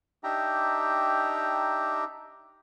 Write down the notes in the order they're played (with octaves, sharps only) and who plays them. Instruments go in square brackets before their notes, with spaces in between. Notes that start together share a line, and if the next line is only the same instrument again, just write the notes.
[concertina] D4 D#4 G4 E5 G5 A#5